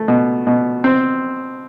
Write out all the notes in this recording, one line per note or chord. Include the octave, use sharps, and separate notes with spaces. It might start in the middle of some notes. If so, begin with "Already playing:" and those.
Already playing: A3
B2
B2
C4